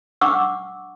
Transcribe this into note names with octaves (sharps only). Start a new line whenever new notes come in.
D4 F#5 C#6 D6 E6